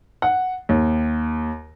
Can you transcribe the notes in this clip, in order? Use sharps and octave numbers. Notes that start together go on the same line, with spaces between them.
F#5
D#2